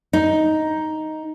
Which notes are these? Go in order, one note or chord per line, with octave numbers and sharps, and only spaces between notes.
D#4